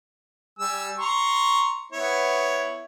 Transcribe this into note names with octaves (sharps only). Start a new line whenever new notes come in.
G3 G#5 E6
A#5 C6 C#6
B3 E4 C#5